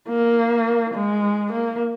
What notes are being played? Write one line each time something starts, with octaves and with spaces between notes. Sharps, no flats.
A#3
G#3
A#3